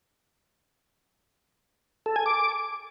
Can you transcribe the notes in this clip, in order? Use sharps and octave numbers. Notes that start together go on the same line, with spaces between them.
A4
G#5
D6